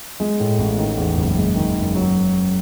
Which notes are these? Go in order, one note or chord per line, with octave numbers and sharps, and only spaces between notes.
G#3
A2
A1
D#3
E2
F#1
G#3
D#3
F#2
F#3